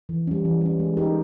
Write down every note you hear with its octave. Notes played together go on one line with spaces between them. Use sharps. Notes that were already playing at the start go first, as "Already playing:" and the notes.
E3
G3 C#4
E3
G3 C#4
G#3
D#4 G4 A#4